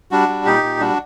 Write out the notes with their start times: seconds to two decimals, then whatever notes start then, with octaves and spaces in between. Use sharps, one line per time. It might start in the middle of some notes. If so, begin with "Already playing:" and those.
0.11 G3 D4 F#4
0.28 G3
0.45 A#2 D#4 G4
0.63 A#2
0.80 G3 D4 F#4